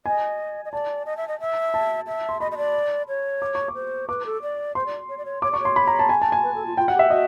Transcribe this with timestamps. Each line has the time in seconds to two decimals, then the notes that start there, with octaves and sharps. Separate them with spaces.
0.06 D#5 G#5
0.65 D#5
0.72 D5 A5
1.06 D#5
1.17 E5
1.28 D#5
1.40 E5
1.74 A5
2.07 E5
2.29 C6
2.40 D#5 B5
2.52 D#5
2.57 D5
3.08 C#5
3.42 D6
3.55 C#6
3.68 D6
3.75 C5
4.09 B4 D6
4.26 A4
4.42 D5
4.75 C5 C6
4.86 D5
5.09 C#5
5.18 D5
5.25 C#5
5.42 C#5 D6
5.51 D5 C#6
5.60 C#5
5.65 C6
5.76 B5
5.87 A#5
5.99 A5
6.09 G#5
6.22 A5
6.32 G#5
6.43 B4
6.55 A4
6.66 F4
6.77 F4 G5
6.88 F#4 F#5
6.94 G4
6.99 E5
7.10 F#4 D#5